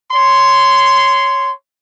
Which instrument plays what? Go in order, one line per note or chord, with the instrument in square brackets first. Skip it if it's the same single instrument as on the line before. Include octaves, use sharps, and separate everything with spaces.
[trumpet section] C#5 C6